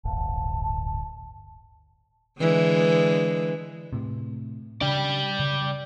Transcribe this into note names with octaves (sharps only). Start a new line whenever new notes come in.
D1 G1 A5
D3 E3 G#3
A2 C3
C#3 D4 D5 G5
C#3